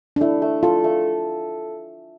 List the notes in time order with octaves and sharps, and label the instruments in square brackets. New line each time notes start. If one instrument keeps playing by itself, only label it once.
[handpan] D4
[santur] A3 [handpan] E4
[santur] A3
[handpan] F4 [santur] A4
[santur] A3